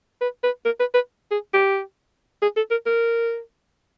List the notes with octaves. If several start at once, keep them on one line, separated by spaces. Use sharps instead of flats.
B4
B4
A#4
B4
B4
G#4
G4
G#4
A4
A#4
A#4